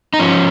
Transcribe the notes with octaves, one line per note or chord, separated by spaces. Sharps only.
D#4
F3 C#4